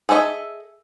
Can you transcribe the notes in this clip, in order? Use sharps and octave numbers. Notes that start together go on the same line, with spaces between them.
G#4 A4 C5 D#5 E5